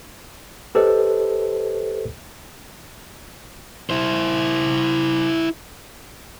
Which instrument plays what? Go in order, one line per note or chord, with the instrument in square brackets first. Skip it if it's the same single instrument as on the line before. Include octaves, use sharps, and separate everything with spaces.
[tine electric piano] G4 A4 B4 C5 D#5
[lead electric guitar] E4 C5